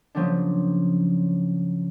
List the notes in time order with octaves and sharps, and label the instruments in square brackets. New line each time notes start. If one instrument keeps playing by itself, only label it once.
[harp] C#3 F3 F#3 A#3 D4